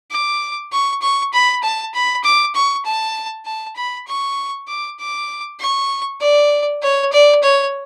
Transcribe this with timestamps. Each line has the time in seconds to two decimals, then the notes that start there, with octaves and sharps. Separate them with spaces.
0.11 D6
0.72 C#6
1.02 C#6
1.33 B5
1.63 A5
1.94 B5
2.24 D6
2.55 C#6
2.85 A5
3.46 A5
3.76 B5
4.08 C#6
4.68 D6
4.99 D6
5.60 C#6
6.21 D5
6.83 C#5
7.13 D5
7.43 C#5